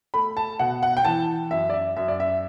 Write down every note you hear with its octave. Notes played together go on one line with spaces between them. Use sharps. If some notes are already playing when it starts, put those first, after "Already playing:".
A3 B5
A5
B2 F#5
F#5
G5
E3 A5
F#2 E5
D5
E5
F#2 E5
D5
E5